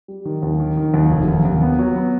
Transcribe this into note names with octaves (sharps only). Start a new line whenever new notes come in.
G3
D#3
D#2
D#3
D#3
D#2
F1
D#2
D#2
B3
F#3
B3